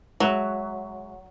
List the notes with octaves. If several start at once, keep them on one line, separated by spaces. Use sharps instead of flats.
F#3 G#3 E5